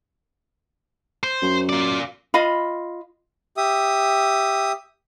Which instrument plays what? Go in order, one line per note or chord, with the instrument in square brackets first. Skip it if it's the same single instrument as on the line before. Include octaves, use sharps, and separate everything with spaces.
[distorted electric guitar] C5
[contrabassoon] F#2
[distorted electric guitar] F4 D5
[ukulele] F4 D#5 F5 B5
[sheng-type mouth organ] G4 E5 D#6